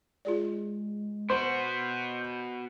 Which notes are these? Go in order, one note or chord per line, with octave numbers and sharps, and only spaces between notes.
G#3 F4 G#4 D5
B3 F#4 C5 G6